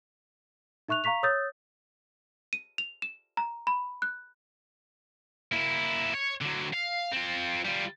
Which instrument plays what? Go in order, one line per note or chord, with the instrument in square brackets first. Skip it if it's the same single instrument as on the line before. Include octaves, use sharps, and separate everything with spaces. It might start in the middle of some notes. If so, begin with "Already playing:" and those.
[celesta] D#4 E5 C#6 F#6 F7
F5 A#5 C#6 B6 F7
C#5 D#6 E6 G6 A6
[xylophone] D#7
F7
E7
A#5
B5
F#6
[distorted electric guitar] A#3 E4
C#5
D3 F#3
F5
C4 F4
G3 F4